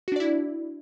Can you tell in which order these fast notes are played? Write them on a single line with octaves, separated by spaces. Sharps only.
F#4 D4 D5 E4